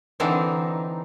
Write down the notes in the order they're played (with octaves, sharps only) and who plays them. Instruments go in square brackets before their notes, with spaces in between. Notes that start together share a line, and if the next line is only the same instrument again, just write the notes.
[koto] D3 E3 C4 D4 D#4